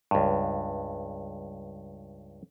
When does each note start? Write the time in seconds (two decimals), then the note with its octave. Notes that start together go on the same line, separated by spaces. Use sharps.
0.11 C#2 G2